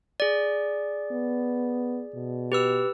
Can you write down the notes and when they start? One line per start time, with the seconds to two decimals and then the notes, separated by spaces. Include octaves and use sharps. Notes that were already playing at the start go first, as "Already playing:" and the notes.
0.20 G#4 D5
1.12 B3
2.14 B2
2.52 G4 B4 E6